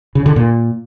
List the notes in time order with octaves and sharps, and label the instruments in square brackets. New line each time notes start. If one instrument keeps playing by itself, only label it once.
[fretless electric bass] C#3
D3
A#2